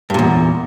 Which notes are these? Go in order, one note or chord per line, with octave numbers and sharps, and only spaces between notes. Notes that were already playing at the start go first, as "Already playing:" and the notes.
E2 G2 A#2